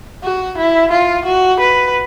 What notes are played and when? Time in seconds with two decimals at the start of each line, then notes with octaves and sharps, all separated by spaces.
0.24 F#4
0.58 E4
0.91 F4
1.25 F#4
1.60 B4